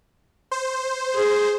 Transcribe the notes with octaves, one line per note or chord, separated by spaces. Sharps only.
C5
G#4